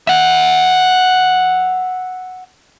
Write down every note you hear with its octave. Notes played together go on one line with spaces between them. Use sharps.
E5 F#5